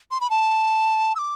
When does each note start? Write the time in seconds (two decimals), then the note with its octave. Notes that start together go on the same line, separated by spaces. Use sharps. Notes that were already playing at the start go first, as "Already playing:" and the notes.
0.11 C6
0.21 B5
0.30 A5
1.15 E6
1.19 D6